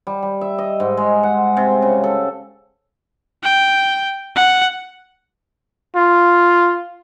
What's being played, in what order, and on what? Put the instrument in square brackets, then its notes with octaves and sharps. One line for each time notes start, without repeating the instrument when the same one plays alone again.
[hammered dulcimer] G3
G3
E5
D#5
G#2
G#3
F#5
C3
C#3
A4
[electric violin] G5
F#5
[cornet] F4